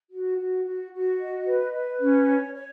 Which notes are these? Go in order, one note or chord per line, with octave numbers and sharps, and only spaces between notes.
F#4
F#4
F#4
F#4
D#5
B4
B4
C#4
C#5
C#5